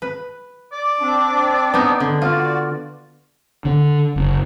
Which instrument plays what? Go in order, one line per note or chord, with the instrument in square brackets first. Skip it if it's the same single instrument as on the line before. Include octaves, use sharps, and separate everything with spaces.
[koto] B4
[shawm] D5
[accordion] C4 D4
[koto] B3 D#4
D3
[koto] F4 [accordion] F#4 D5
[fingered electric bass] D3
F#1